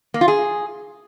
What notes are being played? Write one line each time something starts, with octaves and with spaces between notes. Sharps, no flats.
A#3
F4
G#4